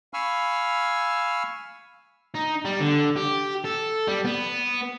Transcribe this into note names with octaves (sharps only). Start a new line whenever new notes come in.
F5 G#5 B5 C#6 E6 F6
D#4
G3
D3
G4
A4
G3
B3